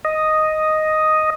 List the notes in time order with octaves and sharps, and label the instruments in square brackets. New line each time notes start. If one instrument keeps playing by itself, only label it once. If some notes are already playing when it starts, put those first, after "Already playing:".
[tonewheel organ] D#5